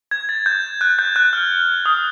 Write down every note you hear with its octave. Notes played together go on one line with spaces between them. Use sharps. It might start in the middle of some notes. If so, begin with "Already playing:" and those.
G#6
A6
G6
F#6
G6
F#6
F6
D#6